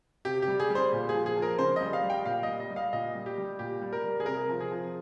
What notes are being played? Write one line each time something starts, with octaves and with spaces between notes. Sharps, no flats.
C3 G4
G4
G3
G#4
G3
C5
A#2
G#4
F3
G#4
F3
A#4
C#3 C5
G3 D#5
F5
G3
G5
A#2 F5
G3 D#5
D#5
G3
F5
A#2 D#5
G3
G4
G3
A#2 G4
G3
A#4
G3
G#4
C3 A#4
F3
G#4
F3